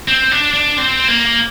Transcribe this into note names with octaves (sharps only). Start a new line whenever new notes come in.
C4
D4
D4
C4
A#3